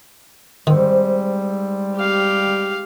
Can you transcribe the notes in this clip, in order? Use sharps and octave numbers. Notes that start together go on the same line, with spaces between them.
G#2 D#3 G3 C4
G4 F5